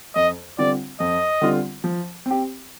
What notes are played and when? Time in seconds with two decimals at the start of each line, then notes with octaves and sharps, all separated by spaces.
0.15 F2 D#5
0.58 D3 G3 C4 F4 D5
1.00 F2 D#5
1.42 D3 G3 C4 F4
1.84 F3
2.26 C4 G4